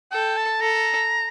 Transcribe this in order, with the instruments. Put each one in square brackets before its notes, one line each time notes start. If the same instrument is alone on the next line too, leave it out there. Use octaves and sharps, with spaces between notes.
[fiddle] A4 [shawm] G5
[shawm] A5
[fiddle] A4 [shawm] A#5